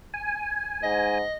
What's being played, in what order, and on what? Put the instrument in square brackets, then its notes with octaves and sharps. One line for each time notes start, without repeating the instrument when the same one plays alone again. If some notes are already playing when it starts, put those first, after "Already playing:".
[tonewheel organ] G#5
[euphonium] G#2 [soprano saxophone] D#5